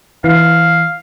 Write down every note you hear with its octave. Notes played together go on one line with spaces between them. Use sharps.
E3 F5